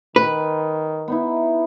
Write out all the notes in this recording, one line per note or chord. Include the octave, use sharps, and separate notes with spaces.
D#3 B4
B3 D#4 E4